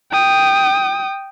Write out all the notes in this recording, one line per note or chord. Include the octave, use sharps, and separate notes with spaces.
G5 D#6